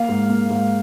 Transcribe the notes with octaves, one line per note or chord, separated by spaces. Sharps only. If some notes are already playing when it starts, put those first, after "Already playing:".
Already playing: A#3 F5
G#2
A#3
G#2